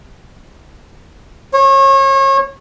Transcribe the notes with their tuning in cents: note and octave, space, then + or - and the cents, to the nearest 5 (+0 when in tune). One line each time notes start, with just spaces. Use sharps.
C#5 -35